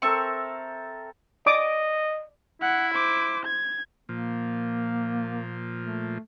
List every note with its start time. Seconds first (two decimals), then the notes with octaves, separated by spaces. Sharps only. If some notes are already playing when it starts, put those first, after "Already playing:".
0.02 C4 A4 A#4 E5 C#6
1.46 D5 D#5 D6 D#6
2.62 E4 F#5
2.94 C5 D6
3.46 G#6
4.09 A#2 F3 A#3
5.81 A3